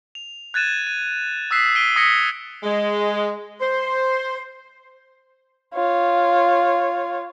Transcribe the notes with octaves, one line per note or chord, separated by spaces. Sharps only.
F7
F#6 G#6 A6 D#7 E7
D#7
D#6 E6 F#6 B6 C7 E7
B6 C7 D7 D#7 G7
D#6 G#6 A#6 B6 C#7 G7
G#3
C5
F4 C#5